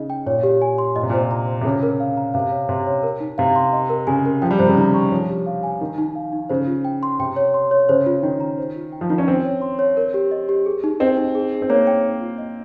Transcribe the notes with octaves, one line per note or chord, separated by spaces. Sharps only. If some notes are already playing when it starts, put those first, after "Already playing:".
Already playing: C#3 D#4 G#4 D#5
G5
A#2 C#5
G4
G#5
C6
A#2 D#5
C3
A#2 C5
A#5
C5
C3
C#3 C#5
A#4
F5
A#5
C3 F5
C#5
C3 C6
C#5
A#4
D#4
C3 F5
C6
D#5
A#4
C#3 G#5
A#4
F3 G5
G3
C3 C5
C#3
D#3 A#5
C#6
F3 C#5
G4
F5
G#5
D#3 A#4
D#4
F5
D#4
C#3 C5
F4
G5
C6
C3 G5
C#5
C6
C#5
C#3 C5
F4
D#3 G5
A#5
C5
F4
G5
F3
D#3 F4
C#4
C4 G5
C#5
C6
C#5
A#4
G4
D#5
G4
G#4
D#4
C4 D#5
D#4
G#4
D#4
C4
A#3 C#5
G5
C5
F4
D#5